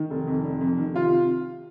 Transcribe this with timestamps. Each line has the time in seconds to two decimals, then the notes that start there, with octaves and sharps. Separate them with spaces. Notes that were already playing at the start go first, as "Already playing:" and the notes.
Already playing: D#3
0.10 F1
0.27 F2
0.44 F1
0.61 F2
0.78 D#3
0.94 C3 F4